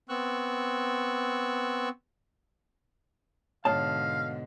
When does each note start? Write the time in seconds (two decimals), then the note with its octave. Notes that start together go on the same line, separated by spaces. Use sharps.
0.09 B3 C4 C#6 E6 F#6
3.65 G#2 B2 D3 C#5 F5 A5